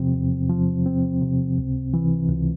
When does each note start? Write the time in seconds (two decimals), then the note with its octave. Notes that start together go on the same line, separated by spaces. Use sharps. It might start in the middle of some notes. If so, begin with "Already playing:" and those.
Already playing: E2 C3 F3 C4
0.14 E2
0.49 F3
0.86 C4
1.22 C3
1.58 C#2
1.94 E3
2.30 C#2